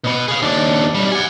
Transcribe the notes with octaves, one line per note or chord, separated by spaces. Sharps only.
B2 B3
G#4 F5
D#2 D4
B1 G3
F#5 G#5